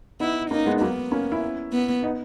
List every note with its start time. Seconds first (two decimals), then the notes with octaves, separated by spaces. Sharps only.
0.20 B3 D#4 E4
0.51 A#3 C#4 D#4
0.66 G#3 B3
0.81 F#3 A#3 B3
1.12 A#3 C#4
1.32 C#4 E4
1.72 B3
2.03 B3 D#4